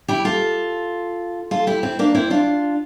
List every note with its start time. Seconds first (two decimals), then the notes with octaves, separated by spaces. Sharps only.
0.08 E4 G4
0.25 F4 A4
1.51 F4 A4
1.67 E4 G4
1.83 C4 E4
1.99 A#3 D4
2.15 C4 E4
2.30 D4 F4